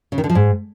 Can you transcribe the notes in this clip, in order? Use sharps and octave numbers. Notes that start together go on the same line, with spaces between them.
C#3
D#3
D3
F3
G#2